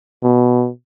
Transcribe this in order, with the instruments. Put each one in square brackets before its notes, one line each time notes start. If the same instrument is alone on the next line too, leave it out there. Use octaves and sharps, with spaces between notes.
[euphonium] B2